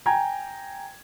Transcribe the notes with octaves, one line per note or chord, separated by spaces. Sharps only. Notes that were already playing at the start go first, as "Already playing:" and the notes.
G5 G#5 A#5 G#6